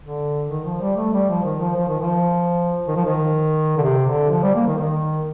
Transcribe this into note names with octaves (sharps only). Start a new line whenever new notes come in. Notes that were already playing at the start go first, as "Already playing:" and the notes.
D3
D#3
F3
G3
A3
G3
F3
D#3
F3
F3
D#3
F3
D#3
F3
D#3
D3
C3
D3
F3
G3
A#3
D#3
D#3